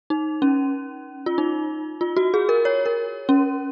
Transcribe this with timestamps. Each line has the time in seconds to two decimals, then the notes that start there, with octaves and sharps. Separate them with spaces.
0.10 D#4
0.42 C#4
1.26 F4
1.38 D#4
2.01 F4
2.17 F#4
2.34 G#4
2.49 A#4
2.65 C#5
2.86 A#4
3.29 C#4